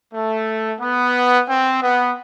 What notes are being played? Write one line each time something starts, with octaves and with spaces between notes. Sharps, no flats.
A3
B3
C4
B3